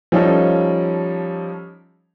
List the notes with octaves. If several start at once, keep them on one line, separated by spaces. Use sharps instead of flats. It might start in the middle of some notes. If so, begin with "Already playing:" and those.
F3 G3 C#4 D#4 A4